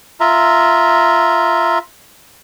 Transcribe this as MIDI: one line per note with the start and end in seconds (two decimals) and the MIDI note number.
0.20 1.79 65
0.20 1.79 76
0.20 1.79 82